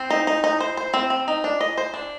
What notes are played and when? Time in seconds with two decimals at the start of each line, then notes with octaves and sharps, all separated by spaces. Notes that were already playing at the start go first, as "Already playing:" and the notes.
Already playing: C4
0.10 D#4
0.27 D#4
0.44 D#4
0.60 C5
0.77 C5
0.94 C4
1.10 C4
1.28 D#4
1.44 D4
1.61 D#5
1.77 C5
1.94 D4